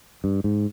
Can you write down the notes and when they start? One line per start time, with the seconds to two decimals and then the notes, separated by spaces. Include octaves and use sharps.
0.24 G2
0.44 G#2